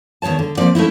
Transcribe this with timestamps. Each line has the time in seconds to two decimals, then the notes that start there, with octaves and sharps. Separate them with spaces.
0.22 E2 D#3 G3 C#5 A5
0.39 D3
0.57 F3 A#3 C4 D5
0.75 A3 C#4 D#4 E4